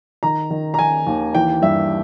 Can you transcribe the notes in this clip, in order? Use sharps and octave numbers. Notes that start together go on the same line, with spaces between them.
D#3 A#5
D#3
A#5
D#3 G#5
D#2
E3 G5
G2 E5